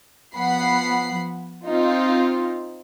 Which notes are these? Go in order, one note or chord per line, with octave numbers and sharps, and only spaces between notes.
F3 B3 F#5 B5 C7
C4 D#4 F4